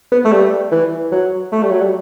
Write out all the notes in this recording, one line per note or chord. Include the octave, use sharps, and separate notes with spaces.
B3
A3
G3
E3
F#3
A3
G3
F#3
G3